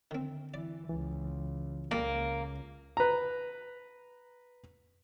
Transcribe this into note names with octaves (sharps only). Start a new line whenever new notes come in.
D3 D#3 C4
E3 D5
C#2 E3
C#2 A#2 G3 A#3
B4 A#5